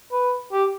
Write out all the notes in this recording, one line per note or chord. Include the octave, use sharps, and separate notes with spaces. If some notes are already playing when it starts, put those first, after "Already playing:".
B4
G4